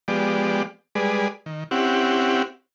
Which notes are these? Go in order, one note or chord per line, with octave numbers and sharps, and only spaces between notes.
F3 G#3 B3 G4 D5
G3 G#3 G#4 B4 D5
D#3
C4 C#4 E4 G4 F#5